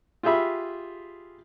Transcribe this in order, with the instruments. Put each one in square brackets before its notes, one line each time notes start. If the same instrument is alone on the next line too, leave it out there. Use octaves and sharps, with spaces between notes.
[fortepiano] F4 G4 G#4 E5 B5